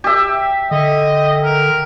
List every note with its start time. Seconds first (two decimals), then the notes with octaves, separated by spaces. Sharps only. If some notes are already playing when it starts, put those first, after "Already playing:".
0.04 G4 E5
0.71 D3 D#5
1.44 A#4